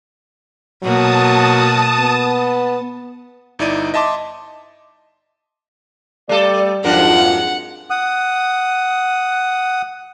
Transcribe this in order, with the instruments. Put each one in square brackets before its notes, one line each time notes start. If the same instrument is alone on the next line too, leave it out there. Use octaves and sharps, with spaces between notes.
[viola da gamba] B2 A#3 F#4 [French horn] F#3 [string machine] A5 D#6
[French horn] B3
[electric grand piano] G1 D#4 E4 D5 D#7
D#5 E5 A5 C6 D6
[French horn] G3 [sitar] A3 A4 [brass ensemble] D5
[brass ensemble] F2 G#2 [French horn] F3 [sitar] F#3 D4 A#4 [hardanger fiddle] F#5
[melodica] F#5 D#6